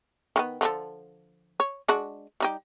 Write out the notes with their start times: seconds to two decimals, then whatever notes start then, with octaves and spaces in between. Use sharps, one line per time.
0.36 D#3 G#3 B3
0.61 D3 F3 A4
1.60 C#5
1.88 G#3 D4 F#4
2.40 G3 D#4 G4